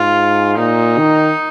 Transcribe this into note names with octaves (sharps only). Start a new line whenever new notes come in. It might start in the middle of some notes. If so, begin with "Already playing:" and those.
Already playing: G#2 F4
A#2 D#4
D#3